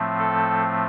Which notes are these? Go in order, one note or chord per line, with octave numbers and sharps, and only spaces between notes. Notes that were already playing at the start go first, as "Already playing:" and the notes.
Already playing: A2 F3 A3 C4
A4